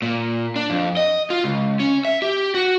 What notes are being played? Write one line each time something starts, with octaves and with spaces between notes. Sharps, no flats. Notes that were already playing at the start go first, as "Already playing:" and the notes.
A#2
D4
F2
D#5
F4
C#2
C#4
E5
G4
F#4